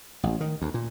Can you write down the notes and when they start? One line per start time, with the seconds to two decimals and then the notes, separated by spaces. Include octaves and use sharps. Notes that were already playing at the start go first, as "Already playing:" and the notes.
0.23 A1
0.41 D#3
0.62 D2
0.74 A#2